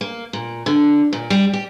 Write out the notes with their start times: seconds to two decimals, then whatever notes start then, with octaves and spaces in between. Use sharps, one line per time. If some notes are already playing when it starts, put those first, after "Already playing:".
0.01 A#3
0.33 A#2
0.66 D3
1.13 A#2
1.30 G3
1.53 G4